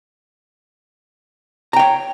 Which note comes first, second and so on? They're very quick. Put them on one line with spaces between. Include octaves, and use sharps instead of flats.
A#5 G5 C#5